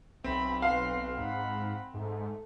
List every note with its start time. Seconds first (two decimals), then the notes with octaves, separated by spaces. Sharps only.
0.24 B1 C4 E5 B5
0.62 B4 F5 C6
1.18 G#2 F#5 B5
1.94 G#2 A3